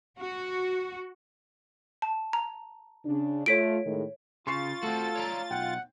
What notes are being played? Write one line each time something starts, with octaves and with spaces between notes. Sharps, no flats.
F#4
A5
A#5
C#3 D4
A3 F4 C#5 B6 D7
A2 D#3 G#3
C#3 F4 C6 C#6 A6 C7
A3 C4 F#4 A4
C#5 D5 A#5
B1 F#5 G5